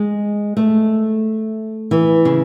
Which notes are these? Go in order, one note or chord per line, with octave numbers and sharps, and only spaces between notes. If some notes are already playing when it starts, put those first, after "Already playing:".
Already playing: G#3
A3
E3
C#3